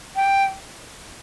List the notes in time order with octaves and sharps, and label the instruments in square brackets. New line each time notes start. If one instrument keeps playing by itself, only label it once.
[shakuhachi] G5